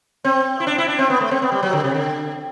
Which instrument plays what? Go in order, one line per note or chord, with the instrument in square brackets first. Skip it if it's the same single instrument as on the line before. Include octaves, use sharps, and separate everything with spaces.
[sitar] C4
E4
D4
E4
D4
C4
B3
A3
C4
B3
G3
F#3
D3
C3
D3